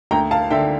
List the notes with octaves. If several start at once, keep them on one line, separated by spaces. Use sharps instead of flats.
D2 G5 A#5
F5 A5
D3 E5 G5